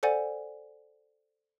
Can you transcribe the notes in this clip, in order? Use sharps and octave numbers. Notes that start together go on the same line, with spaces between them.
A4 C5 D5 F#5 G#5